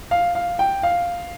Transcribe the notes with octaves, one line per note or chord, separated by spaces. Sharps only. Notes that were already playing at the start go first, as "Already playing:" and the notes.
F5
F5
G5
F5